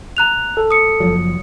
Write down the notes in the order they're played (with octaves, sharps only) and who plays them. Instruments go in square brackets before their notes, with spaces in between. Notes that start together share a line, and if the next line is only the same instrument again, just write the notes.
[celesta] A#5 F#6 F7
[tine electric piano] A4
[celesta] D#6 C#7
[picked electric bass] F#1 F3 F#3